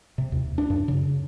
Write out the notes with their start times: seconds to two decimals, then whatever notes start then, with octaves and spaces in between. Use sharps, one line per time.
0.18 C3
0.32 D#2
0.58 D4
0.70 F#2
0.88 C#3